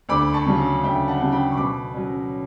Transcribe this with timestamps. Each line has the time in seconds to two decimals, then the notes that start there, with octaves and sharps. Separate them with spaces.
0.09 D2 B5 D6
0.34 A5 C#6
0.47 C#3 F#3
0.84 D2 E5 G5
1.08 F#5 A5
1.21 C#3 F#3
1.32 G5 B5
1.52 C#6
1.57 B2 B5 D6
1.94 F#3 C#4